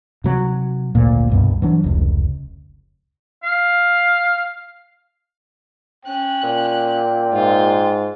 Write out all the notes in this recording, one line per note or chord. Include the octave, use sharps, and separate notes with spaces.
C3 F#3
G#1 D2 A#2
C2 G2 B2
E3 F#3 D4
F1 C#2
F5
C#4 G5 F#6
A#2
G#2 F4